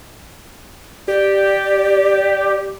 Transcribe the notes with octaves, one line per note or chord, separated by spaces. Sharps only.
G4 D5